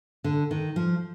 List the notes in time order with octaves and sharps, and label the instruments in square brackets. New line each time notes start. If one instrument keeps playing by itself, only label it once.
[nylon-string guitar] D3
D#3
F3